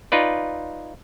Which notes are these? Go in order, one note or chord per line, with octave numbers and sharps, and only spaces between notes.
D#4 F4 B4 D5